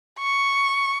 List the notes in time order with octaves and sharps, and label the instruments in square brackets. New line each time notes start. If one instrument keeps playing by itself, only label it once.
[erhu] C#6